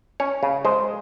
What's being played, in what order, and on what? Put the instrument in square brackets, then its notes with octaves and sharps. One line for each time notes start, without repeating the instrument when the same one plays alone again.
[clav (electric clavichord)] C#4 C#5
C#3
G#3 C5